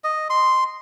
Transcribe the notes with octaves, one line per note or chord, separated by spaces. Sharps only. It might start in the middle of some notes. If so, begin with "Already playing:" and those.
D#5
C6